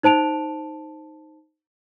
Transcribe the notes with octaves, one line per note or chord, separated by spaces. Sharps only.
D#4 C5 A5 D7 F7